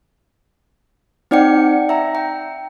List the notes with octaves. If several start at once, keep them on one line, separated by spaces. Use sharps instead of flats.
C4 D#4 D5 F#5 G5 C#7
E5 A#5
G5